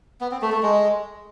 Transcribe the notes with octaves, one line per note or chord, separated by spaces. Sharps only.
B3
C4
A3
A3
G#3